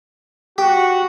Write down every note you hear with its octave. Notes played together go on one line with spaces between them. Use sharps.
F#4 G4